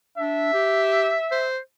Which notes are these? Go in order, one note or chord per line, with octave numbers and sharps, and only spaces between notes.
D4 E5
G4
C5